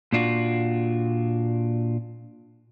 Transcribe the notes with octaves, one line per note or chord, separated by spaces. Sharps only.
A#2 D4 F4 F#4